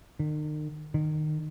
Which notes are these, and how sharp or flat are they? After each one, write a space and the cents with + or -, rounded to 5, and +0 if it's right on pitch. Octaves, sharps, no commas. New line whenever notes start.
D#3 -40
D#3 -25